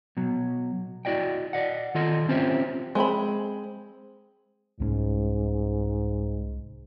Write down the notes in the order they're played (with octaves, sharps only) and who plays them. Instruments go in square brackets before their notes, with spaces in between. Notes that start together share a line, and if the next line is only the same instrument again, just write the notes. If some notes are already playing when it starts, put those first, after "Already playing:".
[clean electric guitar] B2 F#3
E4 F#4 D5 D#5 G5
D5 D#5 F#5
D#3 F4 A4 D#5 C6
C4 C#4 F4 G4 C5 E5
[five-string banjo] G#3 C4 A#5 B5
[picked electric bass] C2 G3 C#4 [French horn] G#2